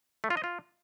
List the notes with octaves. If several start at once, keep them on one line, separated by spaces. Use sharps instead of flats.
A3
F4
D#5
F4